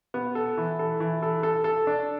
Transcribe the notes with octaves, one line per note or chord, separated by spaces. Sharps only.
B3
A4
E3
A4
E3
A4
A4
A4
D4